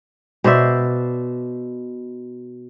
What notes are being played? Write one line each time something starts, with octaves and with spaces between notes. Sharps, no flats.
B2 C5 D5 E5